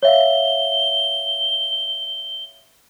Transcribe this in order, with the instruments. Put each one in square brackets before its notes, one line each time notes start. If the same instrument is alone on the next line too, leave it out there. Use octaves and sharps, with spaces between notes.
[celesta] C#5 E5 F5 [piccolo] G7